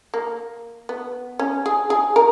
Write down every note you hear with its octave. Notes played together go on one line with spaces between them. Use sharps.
A#3
B3
C#4
G#4
G#4
A#4